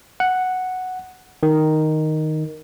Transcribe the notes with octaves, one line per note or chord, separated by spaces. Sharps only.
F#5
D#3